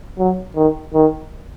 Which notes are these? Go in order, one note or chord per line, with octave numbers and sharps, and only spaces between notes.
F#3
D#3
D#3